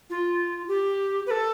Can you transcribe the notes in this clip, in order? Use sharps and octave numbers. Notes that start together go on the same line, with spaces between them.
F4
G4
B4
A4